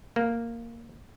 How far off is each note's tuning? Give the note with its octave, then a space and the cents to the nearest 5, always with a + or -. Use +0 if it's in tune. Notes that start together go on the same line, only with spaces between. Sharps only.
A#3 -5